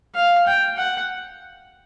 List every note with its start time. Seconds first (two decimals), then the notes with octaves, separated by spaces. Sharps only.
0.15 F5
0.47 G5
0.78 F#5